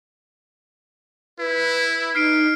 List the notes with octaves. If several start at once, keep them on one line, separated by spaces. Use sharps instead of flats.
E4 B4
D#4 F6 C7 D7